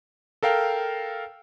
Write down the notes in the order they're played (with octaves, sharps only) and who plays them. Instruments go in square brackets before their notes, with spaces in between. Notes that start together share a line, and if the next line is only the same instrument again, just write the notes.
[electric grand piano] A4 A#4 F5 G5